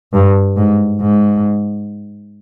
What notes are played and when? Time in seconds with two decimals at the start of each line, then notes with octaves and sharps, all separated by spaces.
0.13 G2
0.57 G#2
1.01 G#2